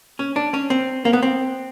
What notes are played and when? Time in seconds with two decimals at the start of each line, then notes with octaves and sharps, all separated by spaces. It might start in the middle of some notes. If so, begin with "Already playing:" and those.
0.19 C#4
0.36 D4
0.54 C#4
0.70 C4
1.05 A#3
1.13 B3
1.23 C4